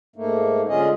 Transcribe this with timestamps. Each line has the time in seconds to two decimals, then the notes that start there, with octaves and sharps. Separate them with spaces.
0.16 G#2 A3 A#3
0.69 D3 G#3 C#4 F4 G#4 D#5